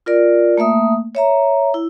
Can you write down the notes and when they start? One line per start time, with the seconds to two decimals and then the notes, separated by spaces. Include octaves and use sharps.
0.06 F4 A#4 D5
0.58 A3 A#3 E5 D#6
1.15 C#5 E5 A#5
1.74 E4